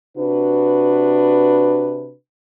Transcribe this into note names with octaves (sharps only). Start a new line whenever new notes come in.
C3 D4 F#4 B4